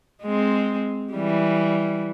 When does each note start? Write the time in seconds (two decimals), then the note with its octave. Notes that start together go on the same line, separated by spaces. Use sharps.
0.23 G#3 C4
1.13 E3 G3